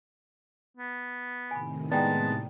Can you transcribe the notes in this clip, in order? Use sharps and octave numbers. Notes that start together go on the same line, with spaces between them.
B3
A2 C3 D#3 G#5 B5
G#3 B3 D5 G5 A5 A#5